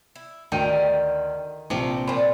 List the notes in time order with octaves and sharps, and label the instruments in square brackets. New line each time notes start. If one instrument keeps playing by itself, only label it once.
[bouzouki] E4
[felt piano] D2 G5 D#7 [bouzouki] D3 [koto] D#3
[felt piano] A#1 [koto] C3 F3 [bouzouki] A#3
[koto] A#2 [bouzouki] G3 D4 [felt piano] C5 B5 C6